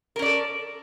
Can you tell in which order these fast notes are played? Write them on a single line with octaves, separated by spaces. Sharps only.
A#4 C#4 D5 A4